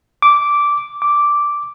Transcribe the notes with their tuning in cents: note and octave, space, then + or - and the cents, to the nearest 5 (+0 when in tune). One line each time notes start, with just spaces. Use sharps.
D6 -10
D6 -5